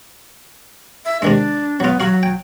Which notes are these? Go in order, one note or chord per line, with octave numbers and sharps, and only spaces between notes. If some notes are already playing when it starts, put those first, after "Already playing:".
E5
C3 D#3 G#3 D4
F#3 B3 F4
F#3 F#4 F5
G5